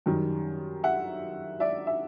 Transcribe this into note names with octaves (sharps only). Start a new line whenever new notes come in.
F#2 D#3 G3
E5 F#5
D5 E5
E5